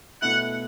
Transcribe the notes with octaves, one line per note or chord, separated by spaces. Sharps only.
B2 A3 E4 F#5